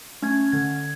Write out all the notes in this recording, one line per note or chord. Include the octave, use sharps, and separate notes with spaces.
A3 C#4 G#6
D3 G#6